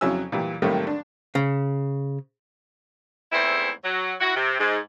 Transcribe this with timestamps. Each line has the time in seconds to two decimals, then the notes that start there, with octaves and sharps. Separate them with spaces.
0.01 F2 C#3 F#3 E4 G#5 E6
0.32 A#2 E3 G3
0.62 C2 A2 D#3 G3 A3 A#3
0.87 D4
1.35 C#3
3.32 E2 G#2 A3 C4 E4 C5
3.84 F#3
4.20 E4 F#4
4.36 C3
4.60 G#2